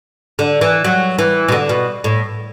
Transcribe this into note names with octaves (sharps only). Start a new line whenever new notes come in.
D3
E3
F#3
E3
B2
D3
B2
A2